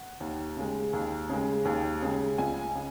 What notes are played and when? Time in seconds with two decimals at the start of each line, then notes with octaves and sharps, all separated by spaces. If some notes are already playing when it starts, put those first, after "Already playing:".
Already playing: F#5
0.20 D#2
0.57 C#3 G#3
0.93 D#2
1.29 C#3 G#3
1.65 D#2
2.02 C#3 G#3
2.38 C#2 G#5
2.75 C#3